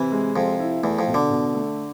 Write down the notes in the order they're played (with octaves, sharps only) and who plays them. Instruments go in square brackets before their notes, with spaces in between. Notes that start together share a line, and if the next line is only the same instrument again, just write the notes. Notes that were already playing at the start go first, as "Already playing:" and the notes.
Already playing: [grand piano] C3 [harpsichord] E3
[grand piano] G#3
[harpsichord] F2 [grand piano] C3
[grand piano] E4
[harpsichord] E2 [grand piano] A3
[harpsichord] F2
[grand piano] B2
[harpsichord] D3
[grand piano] B2
A3